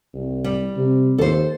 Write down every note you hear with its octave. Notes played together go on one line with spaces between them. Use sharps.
C2
G3
C3
D#2 A4 C5